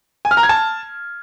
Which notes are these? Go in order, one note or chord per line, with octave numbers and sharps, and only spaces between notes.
G#5
F6
A#5
G#6
A5